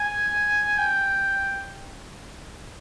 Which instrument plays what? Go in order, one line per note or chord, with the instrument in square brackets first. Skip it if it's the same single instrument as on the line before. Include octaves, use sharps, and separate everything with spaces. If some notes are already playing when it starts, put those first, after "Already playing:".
Already playing: [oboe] G#5
G5